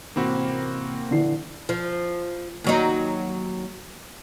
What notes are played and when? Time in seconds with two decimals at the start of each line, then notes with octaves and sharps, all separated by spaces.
0.16 A1 C3 A#3 C4 F#4 B5
1.11 A#1 D3 E3 C7
1.69 F3
2.64 D#2 F#3 D#4